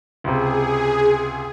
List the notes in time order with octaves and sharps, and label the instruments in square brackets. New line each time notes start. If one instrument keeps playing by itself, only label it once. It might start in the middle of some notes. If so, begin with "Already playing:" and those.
[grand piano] C#2 C3 [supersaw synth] G#4